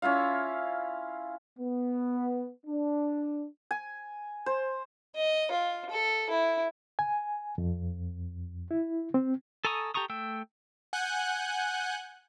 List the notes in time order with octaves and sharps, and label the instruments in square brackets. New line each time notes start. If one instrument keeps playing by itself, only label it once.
[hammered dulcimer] C#4 E4 F4 F5
[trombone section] B3
D4
[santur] G#5
C5
[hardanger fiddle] D#5
F4
A4
E4
[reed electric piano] G#5
F2
E4
C4
[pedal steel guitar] A4 G#5 A#5 C#6 D#6
G4 A4 A#5 C#6 D#6
A3 G5 E6
[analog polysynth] F#5 G#5 F#6 G6